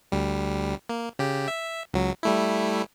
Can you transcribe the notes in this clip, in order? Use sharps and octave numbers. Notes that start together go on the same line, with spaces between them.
D2 G3
A#3
C#3 G4
E5
C#2 F#3
G3 A3 E4